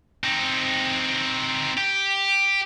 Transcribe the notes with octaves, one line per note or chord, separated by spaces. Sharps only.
C4 D#4
G4